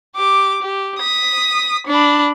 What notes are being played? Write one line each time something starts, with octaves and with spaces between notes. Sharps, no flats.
G4 D6
G4
D#6 B6
D4 B5